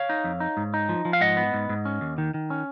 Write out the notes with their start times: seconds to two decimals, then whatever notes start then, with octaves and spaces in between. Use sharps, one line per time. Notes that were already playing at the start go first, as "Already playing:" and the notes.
Already playing: C#5 F5
0.09 D#4
0.24 F2
0.40 D#4
0.57 G#2
0.74 D#4
0.89 F3
1.05 F3
1.13 F5
1.21 G#2 D#5 F#5
1.37 B3
1.54 G#2
1.69 G#2
1.85 C#4
2.01 D#2
2.18 D#3
2.34 D#3
2.50 C#4